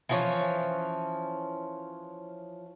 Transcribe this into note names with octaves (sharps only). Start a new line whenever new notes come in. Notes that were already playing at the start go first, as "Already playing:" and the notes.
E3 F3 C#4